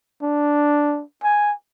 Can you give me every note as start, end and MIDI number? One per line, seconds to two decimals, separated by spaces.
0.22 1.03 62
1.24 1.53 80